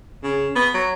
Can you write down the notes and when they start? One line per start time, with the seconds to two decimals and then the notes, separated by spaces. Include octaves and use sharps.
0.24 C#3
0.56 B3
0.74 F#3